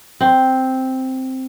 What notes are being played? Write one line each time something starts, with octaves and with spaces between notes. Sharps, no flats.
C4